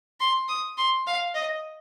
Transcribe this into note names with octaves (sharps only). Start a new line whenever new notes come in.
C6
D#6
C6
F5
D#5